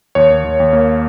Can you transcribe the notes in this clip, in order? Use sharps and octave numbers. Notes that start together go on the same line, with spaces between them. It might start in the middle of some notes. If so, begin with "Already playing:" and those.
D#2 C#5
D#2
D#2
D#2
A#3